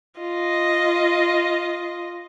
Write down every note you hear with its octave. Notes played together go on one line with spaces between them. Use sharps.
F4 D#5